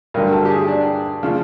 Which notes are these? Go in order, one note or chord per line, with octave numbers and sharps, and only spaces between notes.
G2 D3 F#3 A#4
A4
G4
G#4
D4
C#3 F3